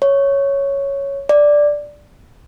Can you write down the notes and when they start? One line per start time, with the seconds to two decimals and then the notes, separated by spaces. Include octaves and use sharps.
0.02 C#5
1.29 D5